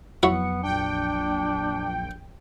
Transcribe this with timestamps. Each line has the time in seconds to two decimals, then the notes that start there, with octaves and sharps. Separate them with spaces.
0.23 F2 F#3 B3 E4 F#4 C#5 C#7
0.63 A#1 D4 G5